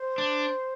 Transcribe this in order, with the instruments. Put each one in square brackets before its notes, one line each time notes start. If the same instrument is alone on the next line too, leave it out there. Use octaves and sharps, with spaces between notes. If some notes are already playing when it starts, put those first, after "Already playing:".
Already playing: [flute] C5
[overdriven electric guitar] D4